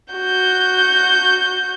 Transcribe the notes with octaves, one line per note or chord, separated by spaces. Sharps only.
F#4 G6